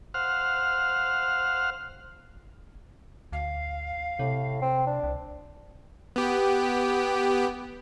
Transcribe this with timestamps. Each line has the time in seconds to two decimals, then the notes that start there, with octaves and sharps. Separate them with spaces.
0.14 C5 F5 F#5 F6
3.32 D2 F5
4.19 A2 C3
4.62 C4
4.87 D4
5.04 C2
6.16 B3 G4